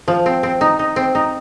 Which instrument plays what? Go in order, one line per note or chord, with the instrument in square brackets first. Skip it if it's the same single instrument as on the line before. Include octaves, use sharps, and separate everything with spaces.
[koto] F3
C4
C4
D#4
D#4
C4
D#4